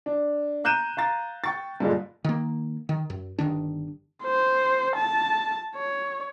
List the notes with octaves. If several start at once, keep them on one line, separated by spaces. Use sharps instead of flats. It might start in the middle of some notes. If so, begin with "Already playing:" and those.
D4
A#5 F#6 G6 D#7 E7
F5 A#5 A6
G5 C#6 A6
G2 A#2 D3 G#3
D#3 A#3
D#3
F#2
G1 C2 D#3 D4
C5
A5
C#5